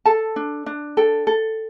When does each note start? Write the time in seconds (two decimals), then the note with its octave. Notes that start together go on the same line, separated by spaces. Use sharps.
0.05 A4 A5
0.36 D4
0.66 D4
0.97 A4 G5
1.27 A4